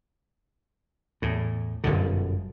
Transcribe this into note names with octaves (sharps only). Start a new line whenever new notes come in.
E2 A2
G1 F#2 B2 D3